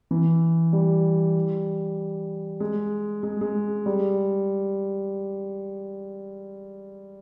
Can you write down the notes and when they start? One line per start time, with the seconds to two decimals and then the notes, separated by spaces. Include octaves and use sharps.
0.11 E3
0.73 G3
2.60 G#3
3.23 G#3
3.41 G#3
3.86 G3